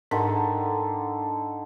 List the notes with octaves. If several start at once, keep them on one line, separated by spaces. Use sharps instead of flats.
G#2 D3 D#3